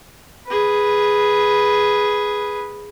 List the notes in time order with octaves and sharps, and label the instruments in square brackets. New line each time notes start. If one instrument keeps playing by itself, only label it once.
[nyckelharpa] G#4 B4